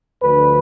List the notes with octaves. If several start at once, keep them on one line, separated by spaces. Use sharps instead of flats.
D2 D3 F3 B4